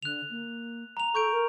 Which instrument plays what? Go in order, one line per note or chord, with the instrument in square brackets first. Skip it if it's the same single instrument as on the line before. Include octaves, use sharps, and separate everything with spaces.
[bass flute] D3 [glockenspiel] F#6 F7
[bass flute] A#3
[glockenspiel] A#5 F7
[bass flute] A4 [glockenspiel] C#6 G6 D7
[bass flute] A#4